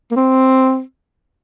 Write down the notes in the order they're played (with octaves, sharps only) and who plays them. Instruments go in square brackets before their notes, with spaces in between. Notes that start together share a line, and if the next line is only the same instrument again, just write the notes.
[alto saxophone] A#3
C4